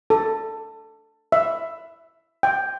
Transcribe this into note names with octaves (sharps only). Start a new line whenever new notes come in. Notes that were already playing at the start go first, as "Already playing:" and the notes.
A4
E5
G5